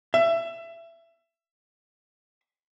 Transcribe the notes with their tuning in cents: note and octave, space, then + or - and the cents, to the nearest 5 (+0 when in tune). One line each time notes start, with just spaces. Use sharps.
E5 +20